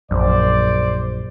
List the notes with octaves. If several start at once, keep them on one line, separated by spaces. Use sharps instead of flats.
A#1 F#2 A#2 C5 D5